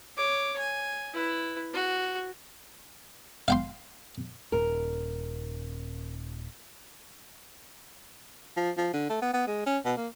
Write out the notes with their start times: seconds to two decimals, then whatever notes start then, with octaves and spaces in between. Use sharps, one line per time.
0.17 C#5 D6
0.58 G#5
1.14 E4 B4
1.74 F#4
3.48 F5 G5 C6
4.52 D#1 A#4
8.57 F3
8.77 F3
8.93 D3
9.10 A3
9.22 B3
9.33 B3
9.47 G#3
9.66 C#4
9.85 B2
9.97 A#3